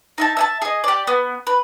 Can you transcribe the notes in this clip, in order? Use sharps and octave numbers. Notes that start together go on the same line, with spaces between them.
D#4 E5 A5
E5 G#5 A5
G#4 D#5
G4 D5
B3
B4